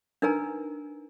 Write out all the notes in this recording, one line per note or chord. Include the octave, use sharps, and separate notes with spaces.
D4 D#4 A#4 B4 G#5 A#5